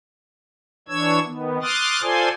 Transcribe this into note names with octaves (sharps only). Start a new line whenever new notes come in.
E3 D4 C#5 E6 G#6
D#3 B3
C6 D6 D#6 F6 F#6 A6
F4 A4 C5 D5 G#5 C6